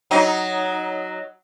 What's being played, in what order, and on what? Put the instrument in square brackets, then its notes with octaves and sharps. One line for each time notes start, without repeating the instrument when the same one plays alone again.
[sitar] F#3 D#4